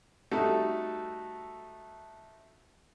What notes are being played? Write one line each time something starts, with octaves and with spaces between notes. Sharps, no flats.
G3 A3 D#4 F#4 A4